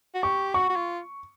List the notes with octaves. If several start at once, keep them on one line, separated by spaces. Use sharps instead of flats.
F#4
G4 C#6
F#4 C#6
F#4
F4